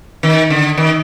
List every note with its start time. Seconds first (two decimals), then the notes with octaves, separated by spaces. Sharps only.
0.23 D#3
0.50 D3
0.78 D#3